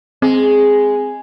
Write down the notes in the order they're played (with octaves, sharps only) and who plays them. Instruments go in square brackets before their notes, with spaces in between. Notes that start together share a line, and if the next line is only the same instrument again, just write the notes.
[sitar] G#3 [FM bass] C4